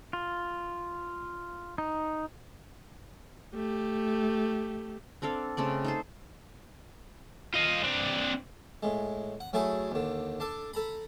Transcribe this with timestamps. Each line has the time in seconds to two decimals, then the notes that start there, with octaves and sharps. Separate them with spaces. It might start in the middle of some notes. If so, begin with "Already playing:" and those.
0.13 F4
1.78 D#4
3.54 A3 G4
5.22 C4 D4 A4 F5
5.57 C#3 A3 C4 D5
5.85 D#4 A4 C5
7.54 F4 D#5
7.84 C4 D4
8.83 A2 G#3
9.40 F#5
9.53 F#3 A3 E4 G#4 A4
9.91 D#2 D3
10.40 D4 A4
10.74 A4 A#5 B5